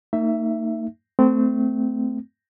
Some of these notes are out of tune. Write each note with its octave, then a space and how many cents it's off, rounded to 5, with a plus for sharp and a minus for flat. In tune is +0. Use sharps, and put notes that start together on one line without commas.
A#3 -45 D#4 +0 E5 +10
A3 +0 C4 -25